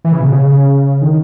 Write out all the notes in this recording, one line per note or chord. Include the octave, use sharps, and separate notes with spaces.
E3
C#3
B2
C#3
D#3